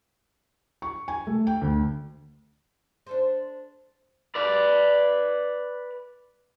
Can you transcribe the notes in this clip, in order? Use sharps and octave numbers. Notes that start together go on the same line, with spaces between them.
C#6
G#5
A3
G5
D2
D4 A4 C5
B4 D5